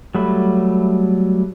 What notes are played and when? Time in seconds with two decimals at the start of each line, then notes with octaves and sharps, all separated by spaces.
0.15 F#3 G3 A3 B5